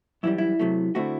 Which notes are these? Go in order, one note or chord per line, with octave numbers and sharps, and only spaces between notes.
F#2 E3 G3 E4
E4
C3 F#3 A3
D3 A3 C4 E4 F#4